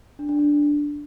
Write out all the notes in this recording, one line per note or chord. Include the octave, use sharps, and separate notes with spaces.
D4
D4
D4